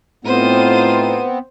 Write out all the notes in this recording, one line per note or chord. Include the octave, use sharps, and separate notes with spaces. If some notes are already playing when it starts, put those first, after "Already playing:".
A2 B3 C4 D#4 F4 C5 D#7